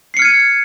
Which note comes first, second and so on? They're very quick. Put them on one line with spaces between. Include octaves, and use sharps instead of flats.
C7 C#7 F6 G#6 D#7